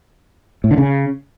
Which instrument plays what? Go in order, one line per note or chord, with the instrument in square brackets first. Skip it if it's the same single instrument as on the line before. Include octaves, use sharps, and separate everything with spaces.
[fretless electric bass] A2
D3
C#3